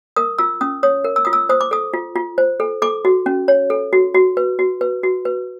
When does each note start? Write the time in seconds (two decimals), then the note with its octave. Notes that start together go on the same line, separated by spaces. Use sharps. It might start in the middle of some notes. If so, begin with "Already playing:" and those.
0.16 A#4 D#6
0.38 F4 E6
0.61 C#4 D#6
0.83 C#5 D#6
1.04 A#4
1.16 E6
1.25 F4 D#6
1.33 E6
1.49 C5 D#6
1.61 D6
1.71 A4 D#6
1.94 F4
2.16 F4
2.38 C5
2.60 A4
2.82 A4 D6
3.05 F#4
3.26 C#4
3.48 C#5
3.70 A4
3.93 F#4
4.14 F#4
4.37 B4
4.59 F#4
4.81 B4
5.03 F#4
5.25 B4